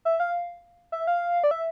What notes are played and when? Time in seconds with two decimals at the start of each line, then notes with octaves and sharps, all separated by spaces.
0.05 E5
0.20 F5
0.92 E5
1.07 F5
1.44 D5
1.51 E5